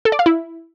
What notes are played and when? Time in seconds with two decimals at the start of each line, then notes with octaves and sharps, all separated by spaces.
0.05 A4
0.12 D5
0.19 F5
0.26 E4